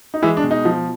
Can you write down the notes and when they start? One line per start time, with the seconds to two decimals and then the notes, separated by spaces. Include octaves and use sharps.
0.14 D#4
0.22 E3 G#3 E4
0.37 D4
0.44 B2
0.51 D#4
0.65 F3